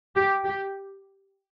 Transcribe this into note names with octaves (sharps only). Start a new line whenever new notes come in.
G4
G4